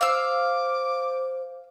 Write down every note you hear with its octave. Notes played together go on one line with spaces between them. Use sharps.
C5 F5 D6 E6